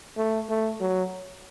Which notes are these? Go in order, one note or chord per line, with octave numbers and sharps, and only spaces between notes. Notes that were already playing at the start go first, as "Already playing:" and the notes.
A3
A3
F#3